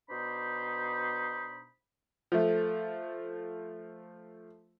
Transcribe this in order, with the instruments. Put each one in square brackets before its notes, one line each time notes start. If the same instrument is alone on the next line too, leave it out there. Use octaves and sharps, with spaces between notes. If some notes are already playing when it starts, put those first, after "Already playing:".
[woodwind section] B2 D4 D#4 C5 B5
[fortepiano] F3 A3